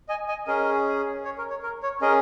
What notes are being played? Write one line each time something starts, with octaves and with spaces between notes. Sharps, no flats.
D#5 G#5
D#5 G#5
C#4 G#4 A#4 D#5
C#5
A#4
C#5
A#4
C#5
C#4 G#4 A#4 D#5